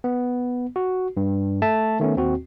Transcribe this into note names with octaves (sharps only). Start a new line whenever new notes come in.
B3
F#4
G2
A3 E5 A5
D#3 A3 B3 C#4
D#2 C4 F#4